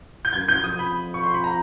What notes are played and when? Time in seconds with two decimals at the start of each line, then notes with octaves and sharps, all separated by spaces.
0.25 G6
0.33 F#2 G#6
0.49 G6
0.63 F2 D#6
0.79 B5
1.14 C#6
1.23 C6
1.34 B5
1.44 A#5